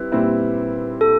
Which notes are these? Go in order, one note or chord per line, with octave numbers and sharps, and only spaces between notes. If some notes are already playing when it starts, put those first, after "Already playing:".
Already playing: G3 C4 E4 B4
A#2 G3 C4 E4
A4